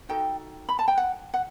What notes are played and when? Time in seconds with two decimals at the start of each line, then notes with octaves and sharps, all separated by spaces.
0.09 D#4 F#4 A4 G5
0.69 B5
0.79 A5
0.88 G5
0.98 F#5
1.34 F#5